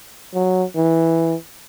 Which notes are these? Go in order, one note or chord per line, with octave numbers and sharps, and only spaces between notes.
F#3
E3